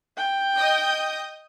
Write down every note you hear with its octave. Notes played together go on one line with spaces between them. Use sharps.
G5
D#5 D#6 G6